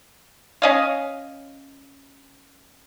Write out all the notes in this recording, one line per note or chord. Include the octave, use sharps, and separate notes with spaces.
C#4 D#5 F5